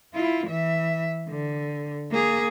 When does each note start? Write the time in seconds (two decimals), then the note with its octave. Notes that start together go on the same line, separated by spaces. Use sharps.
0.14 E4 F4
0.47 E3 E5
1.28 D3
2.11 A#3 G#4